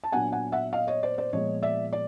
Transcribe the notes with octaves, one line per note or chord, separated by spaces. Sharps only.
A5
A#2 F#3 B3 D4 F#5 G#5
F#5 G#5
E5 F#5
D#5 F5
C#5 D#5
C5 D5
C5 D5
A#2 F3 G#3 B3 C#5 D#5
D5 E5
D5